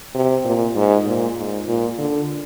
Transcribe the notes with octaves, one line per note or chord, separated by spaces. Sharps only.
C3
A#2
G#2
A#2
G#2
A#2
D3